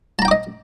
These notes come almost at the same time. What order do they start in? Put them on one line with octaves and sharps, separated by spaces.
A5 A#5 G5 D6 D#5